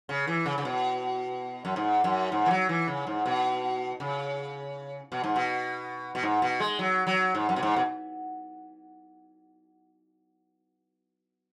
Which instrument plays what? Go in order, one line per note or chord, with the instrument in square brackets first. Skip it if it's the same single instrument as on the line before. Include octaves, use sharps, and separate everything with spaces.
[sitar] C#3
E3
C#3
C#3
B2
F#2
G#2
F#2
G#2
E3
F#3
E3
C#3
G#2
B2
C#3
B2
G#2
B2
B2
G#2
B2
G#3
F#3
F#3
G#2
F#2
B2
G#2
B2